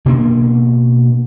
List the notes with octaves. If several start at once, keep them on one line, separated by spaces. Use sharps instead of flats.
B2 A#3 D4